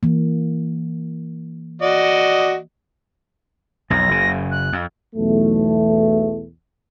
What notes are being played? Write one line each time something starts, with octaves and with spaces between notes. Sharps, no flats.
E3 A#3
F#4 D5 D#5
B1 F2 A#6
F#1 C#3
F#6
F2
B1 E2 A3